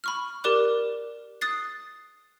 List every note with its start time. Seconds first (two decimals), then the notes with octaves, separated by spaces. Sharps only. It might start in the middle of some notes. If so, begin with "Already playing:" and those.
0.04 B5 C#6 F6
0.44 G4 A#4 D5 D6 F#6
1.41 D#6 F#6 A6 C7